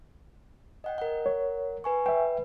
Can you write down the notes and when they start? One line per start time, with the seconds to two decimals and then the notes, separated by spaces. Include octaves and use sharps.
0.84 D#5 F#5 G5
0.98 A#4 F#5
1.26 C#5
1.84 B4 G#5 C#6
2.06 B4 E5 G5